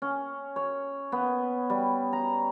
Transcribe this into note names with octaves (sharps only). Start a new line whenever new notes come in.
C#4
C#5
B3
G3
A#5